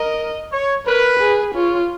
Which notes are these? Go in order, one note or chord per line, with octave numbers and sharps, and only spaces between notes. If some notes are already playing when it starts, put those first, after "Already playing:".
Already playing: A#4 D#5
C#5
A#4 B4
G#4
F4 C#5